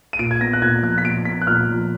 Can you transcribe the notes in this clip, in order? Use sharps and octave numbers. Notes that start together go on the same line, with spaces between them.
D#7
A#2 D7
G#6
B3 A#6
F#6
A#2 G#6
F3 F#6
B6
A#2 D7
B3 B6
F#6
A#2 F6
F3